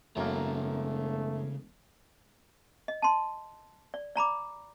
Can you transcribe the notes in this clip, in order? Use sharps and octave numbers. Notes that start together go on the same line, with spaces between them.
E1 F#2 C#3 A3 A#3 A#5
D#5
A5 C6
D5
D5 A#5 B5 D6